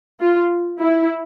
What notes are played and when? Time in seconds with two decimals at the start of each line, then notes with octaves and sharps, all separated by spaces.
0.20 F4
0.80 E4